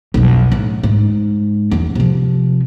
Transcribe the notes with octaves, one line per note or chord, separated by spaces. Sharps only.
B1 F2
A2
G#2
F#1 E2
C3 F3